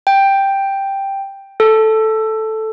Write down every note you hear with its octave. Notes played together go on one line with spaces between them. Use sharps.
G5
A4